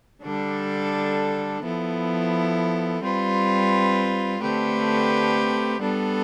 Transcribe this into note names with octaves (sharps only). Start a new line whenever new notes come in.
D3 G3 D4 A4
F3 B3 E4 A4
G3 C4 F4 B4
D3 A3 C4 G4 B4
G3 B3 D4 A4